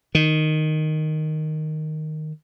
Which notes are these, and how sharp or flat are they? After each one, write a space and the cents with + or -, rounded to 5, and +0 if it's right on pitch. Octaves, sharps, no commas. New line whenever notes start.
D#3 -5